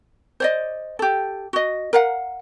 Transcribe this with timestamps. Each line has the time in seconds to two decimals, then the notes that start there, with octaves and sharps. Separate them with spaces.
0.40 C5 D5 D#5
0.99 G4 A4
1.53 F#4 D#5
1.93 A#4 F5 F#5